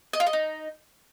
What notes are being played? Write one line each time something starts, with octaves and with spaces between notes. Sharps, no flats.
D#5
F4
D#5
D#4